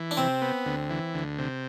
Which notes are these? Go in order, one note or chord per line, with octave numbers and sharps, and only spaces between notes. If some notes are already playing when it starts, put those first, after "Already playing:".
Already playing: E3
D4
C3 C4
B3
D2
E3
D2
C3